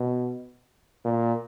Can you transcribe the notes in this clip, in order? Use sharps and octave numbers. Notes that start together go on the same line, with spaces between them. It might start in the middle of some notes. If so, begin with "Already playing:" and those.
Already playing: B2
A#2